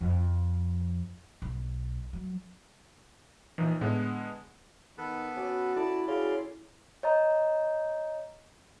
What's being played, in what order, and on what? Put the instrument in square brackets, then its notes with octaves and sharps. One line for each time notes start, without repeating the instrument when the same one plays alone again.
[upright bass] F2
B1
F#3
[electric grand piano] A#1 A#2 D#4 [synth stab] E3
[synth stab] A2 [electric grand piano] D3 G#3 B3
[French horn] D#3 [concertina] B3 A4 B4
[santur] C#4 D6 [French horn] F#4
[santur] E4 A4 [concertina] D5 A5
[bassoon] C#3 [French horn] F#4 [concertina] D5 F5 C6
[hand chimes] C#5 D#5 A#5